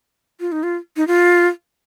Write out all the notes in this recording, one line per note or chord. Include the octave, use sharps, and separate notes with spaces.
F4
D#4
F4
D#4
F4